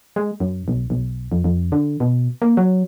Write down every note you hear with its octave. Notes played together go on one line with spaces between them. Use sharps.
G#3
F#2
B1
B1
F2
F2
D3
B2
A#3
F#3